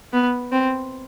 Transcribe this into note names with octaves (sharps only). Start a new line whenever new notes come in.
B3
C4